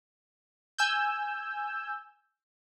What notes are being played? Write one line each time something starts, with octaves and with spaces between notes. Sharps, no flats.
G#5 E6 G6